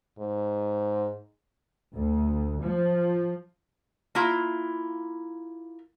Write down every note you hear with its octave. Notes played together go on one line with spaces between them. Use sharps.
G#2
D2
F3
A#3 E4 F4